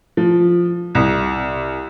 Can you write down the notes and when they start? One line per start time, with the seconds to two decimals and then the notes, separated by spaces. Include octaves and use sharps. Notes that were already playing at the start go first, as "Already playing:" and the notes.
0.17 F3
0.95 C2